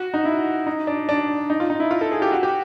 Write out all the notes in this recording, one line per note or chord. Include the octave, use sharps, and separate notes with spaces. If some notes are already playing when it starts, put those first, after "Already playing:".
Already playing: F#4
D#4
E4
D#4
D4
D4
D#4
F4
D#4
E4
F4
A4
G#4
G4
F#4
G4